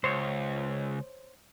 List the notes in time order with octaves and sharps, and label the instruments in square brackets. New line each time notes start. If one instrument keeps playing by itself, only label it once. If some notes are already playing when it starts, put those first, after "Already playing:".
[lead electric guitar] C#2 [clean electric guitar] C5 C#5